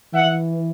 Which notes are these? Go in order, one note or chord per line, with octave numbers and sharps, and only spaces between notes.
E3 E5 F#5